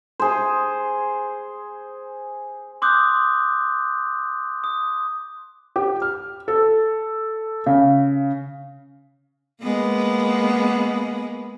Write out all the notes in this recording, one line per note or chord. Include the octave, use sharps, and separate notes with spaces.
G#4 C5
C6 D6 D#6 F#6 G6
D#6
G4
F6
A4
C#3
G#3 A#3 B3